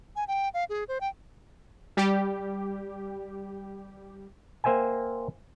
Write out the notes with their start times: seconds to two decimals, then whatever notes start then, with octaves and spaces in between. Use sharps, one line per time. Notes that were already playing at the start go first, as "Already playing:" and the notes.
0.16 G#5
0.28 G5
0.54 F5
0.69 G#4
0.88 C5
1.01 G5
1.97 G3 G4
4.64 A#3 C5 E5 G5 G#5